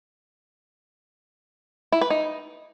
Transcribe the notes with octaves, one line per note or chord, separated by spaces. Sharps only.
E4
B4
D#4